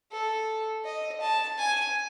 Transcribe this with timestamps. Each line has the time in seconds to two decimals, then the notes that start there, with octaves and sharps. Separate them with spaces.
0.11 A4
0.85 D#5
1.21 A5
1.58 G#5